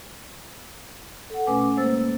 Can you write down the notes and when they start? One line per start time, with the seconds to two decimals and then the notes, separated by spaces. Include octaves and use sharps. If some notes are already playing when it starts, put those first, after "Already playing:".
1.30 A4 F#5
1.47 B2 A3 C#4 B4 G#5 D6
1.77 G#3 A#3 C5 E6 A6